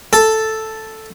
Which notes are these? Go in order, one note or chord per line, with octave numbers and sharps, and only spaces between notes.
A4